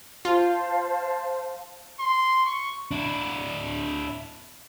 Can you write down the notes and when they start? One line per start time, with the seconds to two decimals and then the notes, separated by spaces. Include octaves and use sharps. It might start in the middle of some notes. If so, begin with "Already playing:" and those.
0.25 F4 C5 F5 A5
2.00 C6
2.46 C#6
2.91 D4 E4